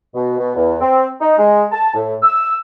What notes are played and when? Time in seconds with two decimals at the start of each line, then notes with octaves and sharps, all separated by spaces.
0.14 B2
0.38 B2
0.55 E2
0.80 C4
1.20 D#4
1.37 G#3
1.72 A5
1.94 A2
2.22 E6